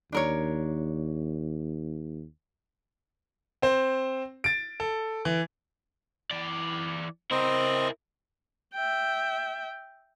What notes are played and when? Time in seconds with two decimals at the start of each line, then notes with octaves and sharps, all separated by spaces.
0.12 D#2 D4 A#4 C#5
3.62 C4 C5
4.44 A6 D7
4.80 A4
5.25 E3
6.31 E3 D5
7.31 C4 E4 A#4 C5 D#5
8.75 E5 G5